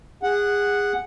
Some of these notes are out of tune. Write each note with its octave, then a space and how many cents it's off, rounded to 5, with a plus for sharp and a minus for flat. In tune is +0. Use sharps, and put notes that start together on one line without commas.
G#4 -25 F#5 +0